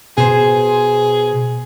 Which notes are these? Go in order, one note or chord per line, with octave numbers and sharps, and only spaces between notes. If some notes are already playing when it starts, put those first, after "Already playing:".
B2 G#4 C5